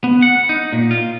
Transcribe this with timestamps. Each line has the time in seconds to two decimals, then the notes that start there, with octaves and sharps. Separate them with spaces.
0.04 B3
0.22 F#5
0.49 D#4
0.73 A#2
0.91 F4